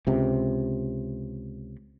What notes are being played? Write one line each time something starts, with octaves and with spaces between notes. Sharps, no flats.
C#2 C3